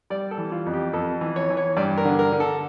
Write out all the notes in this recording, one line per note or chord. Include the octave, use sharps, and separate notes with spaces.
G3 D5
A4
E3
F4
F2
G4
F2 A4
E3
C#5
E3
C#5
G2 D5
A#4
D3
A#4
D3
A4